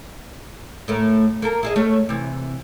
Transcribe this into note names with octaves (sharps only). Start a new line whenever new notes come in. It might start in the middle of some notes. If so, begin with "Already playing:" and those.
A2 A3 A#4
A#3 A4 A#4
E4 G#4 D#5
A3 C#4
C3 E3